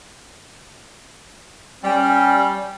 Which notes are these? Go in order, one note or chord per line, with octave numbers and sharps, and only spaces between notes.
G3 C#4